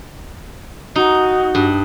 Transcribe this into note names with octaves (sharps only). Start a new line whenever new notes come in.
D#4 F#4
G2